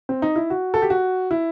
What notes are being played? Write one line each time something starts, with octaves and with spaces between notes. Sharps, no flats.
C4
D#4
E4
F#4
A4
G4
F#4
E4